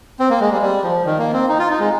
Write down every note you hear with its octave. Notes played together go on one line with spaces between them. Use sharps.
C4
A#3
G#3
G3
G3
F3
D#3
A#3
C4
D#4
F4
D#4
G#3